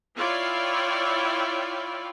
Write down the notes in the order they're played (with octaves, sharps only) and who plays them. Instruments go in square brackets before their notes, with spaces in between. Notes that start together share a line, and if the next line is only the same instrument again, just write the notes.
[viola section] E4 F4 C#5 D5 G5